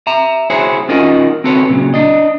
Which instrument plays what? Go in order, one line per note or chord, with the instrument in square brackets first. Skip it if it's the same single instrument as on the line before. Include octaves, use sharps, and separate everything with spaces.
[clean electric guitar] E5 A#5
E4 F#4 G#4 C5 C#5
C#4 D#4 F4 F#4 A#4 D#5
C4 F#4 A4 B4 C#5
A#2 C#3 F#3
D4 D#5